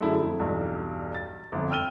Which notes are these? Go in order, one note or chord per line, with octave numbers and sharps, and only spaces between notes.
F#2 D3 A3 E4 G#4
F2
B1 E2 G2
A6
G1 F2
G5 E6 F6 D#7 G7